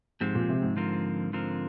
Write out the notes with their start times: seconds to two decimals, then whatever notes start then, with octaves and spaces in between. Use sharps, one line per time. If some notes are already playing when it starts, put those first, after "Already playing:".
0.21 G#2 F3 G#3 C4 G4
0.35 A#2
0.49 C3
0.63 G#2
0.77 D3 F3 C4 F4 A#4
1.33 D3 F3 C4 F4 A#4